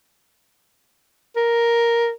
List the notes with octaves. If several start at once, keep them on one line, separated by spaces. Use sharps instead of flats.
A#4